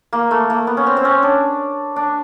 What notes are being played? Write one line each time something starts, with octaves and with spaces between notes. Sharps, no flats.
A#3
A3
A#3
B3
C#4
C4
C4
C#4
D4
D4